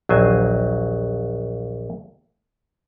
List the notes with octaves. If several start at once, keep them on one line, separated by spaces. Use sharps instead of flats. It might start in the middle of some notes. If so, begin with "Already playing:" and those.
A#1 D#2 F#3 C5 G#5